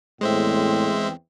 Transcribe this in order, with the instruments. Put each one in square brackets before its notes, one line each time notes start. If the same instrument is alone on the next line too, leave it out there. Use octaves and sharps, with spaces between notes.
[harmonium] E2 C4 [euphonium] A2 [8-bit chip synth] G#3 C5 E5